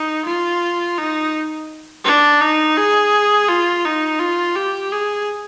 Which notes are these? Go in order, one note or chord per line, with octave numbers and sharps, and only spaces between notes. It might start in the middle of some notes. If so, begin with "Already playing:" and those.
Already playing: D#4
F4
D#4
D4
D#4
G#4
F4
D#4
F4
G4
G#4